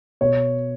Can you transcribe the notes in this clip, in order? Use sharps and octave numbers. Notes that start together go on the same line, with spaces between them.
B2 C#5